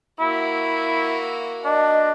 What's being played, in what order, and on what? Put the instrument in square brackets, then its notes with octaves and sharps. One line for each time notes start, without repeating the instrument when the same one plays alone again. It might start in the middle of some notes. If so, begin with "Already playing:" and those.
[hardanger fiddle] A#3 F#4 [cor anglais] E4
[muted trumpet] D4 [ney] D#5